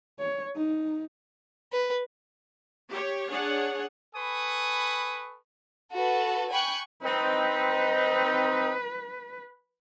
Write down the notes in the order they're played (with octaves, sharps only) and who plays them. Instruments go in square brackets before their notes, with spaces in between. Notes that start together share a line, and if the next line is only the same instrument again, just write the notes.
[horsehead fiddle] C#5
D#4
[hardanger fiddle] B4
[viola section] G4 C#5
D4 G#4 C#5 F#5
[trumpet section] A4 B4 G#5 B5 C#6 D#6
[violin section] F#4 A4 B4
G5 G#5 B5 C#6 F#6
[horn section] C4 D#4 [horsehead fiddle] B4